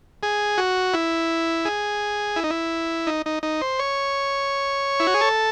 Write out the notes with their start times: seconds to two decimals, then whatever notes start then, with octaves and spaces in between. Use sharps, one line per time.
0.23 G#4
0.58 F#4
0.94 E4
1.65 G#4
2.36 E4
2.43 D#4
2.50 E4
3.07 D#4
3.26 D#4
3.43 D#4
3.61 C5
3.79 C#5
5.00 E4
5.07 F#4
5.14 G#4
5.21 A4